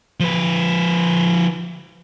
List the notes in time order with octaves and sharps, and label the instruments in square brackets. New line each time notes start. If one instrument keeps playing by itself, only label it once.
[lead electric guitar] F3 B4